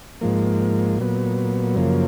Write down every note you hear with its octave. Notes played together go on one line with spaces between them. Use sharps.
G#2 F3 A#3
A#2 F#3 B3
F#2 C#3 F3 A#3